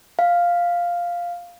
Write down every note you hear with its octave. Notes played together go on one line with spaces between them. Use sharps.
F5